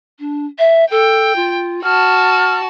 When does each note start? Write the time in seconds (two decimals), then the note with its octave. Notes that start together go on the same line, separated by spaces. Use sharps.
0.19 D4
0.59 E5
0.91 A4 G5
1.36 F4
1.84 F#4 A5 F6